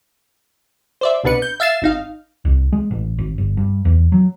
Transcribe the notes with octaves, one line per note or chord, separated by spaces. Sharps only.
C5 D5 E5
C2 B2 D4 B4 C#7
G6
E5 F5 A6 C7 E7
G#1 D#4 F5
C2
G#3
A1
G#1
G1
G2
E2
F#3